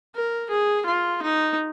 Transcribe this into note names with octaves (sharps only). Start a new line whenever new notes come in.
A#4
G#4
F4
D#4